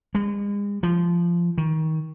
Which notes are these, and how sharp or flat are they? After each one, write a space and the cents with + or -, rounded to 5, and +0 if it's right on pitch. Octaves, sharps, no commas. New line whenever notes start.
G#3 -40
F3 -15
D#3 +25